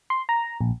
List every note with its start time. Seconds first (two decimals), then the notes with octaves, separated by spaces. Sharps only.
0.10 C6
0.29 A#5
0.61 A#1